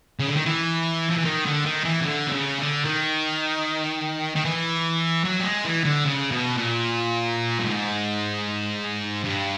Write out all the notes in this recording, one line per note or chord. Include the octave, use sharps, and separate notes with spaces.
C#3
D3
D#3
E3
F3
E3
D#3
D3
D#3
E3
C#3
D3
C3
C#3
D3
D#3
D#3
E3
F#3
G3
G#3
E3
D3
C#3
B2
A#2
G2
G#2
G2